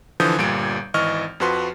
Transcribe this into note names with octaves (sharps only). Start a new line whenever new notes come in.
D3 E3 F3 D#6 G6
G1 A#2 G3 D7
G#1 E3 D#5 C#6 F6
F2 F3 F#4 B4 C6